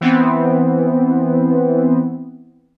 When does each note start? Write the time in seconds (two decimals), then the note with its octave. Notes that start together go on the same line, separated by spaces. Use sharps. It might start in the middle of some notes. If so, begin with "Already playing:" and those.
0.01 E3 B3 C4